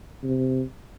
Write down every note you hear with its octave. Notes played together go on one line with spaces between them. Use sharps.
C3